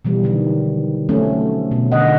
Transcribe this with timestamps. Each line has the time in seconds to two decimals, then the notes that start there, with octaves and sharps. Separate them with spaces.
0.05 B2 E3 G3
0.24 D3 D#3 F#3
1.09 F3 F#3 A3 C4 C#4
1.71 B2
1.92 D3 D#3 D#5 F#5